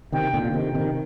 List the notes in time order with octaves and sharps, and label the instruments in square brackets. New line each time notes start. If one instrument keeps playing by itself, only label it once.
[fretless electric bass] C3 D#3 [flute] G5
[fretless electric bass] A#2 D3
C3 D#3
C3 D#3